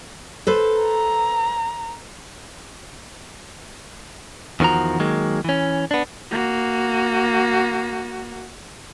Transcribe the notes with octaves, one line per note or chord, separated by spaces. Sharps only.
A4 B4 C5
A#5
E2 D#3 F3 F#4 A#5
D#3 F#3 G#3 A#3
E3 C#4
B3 D4
A#3 F#4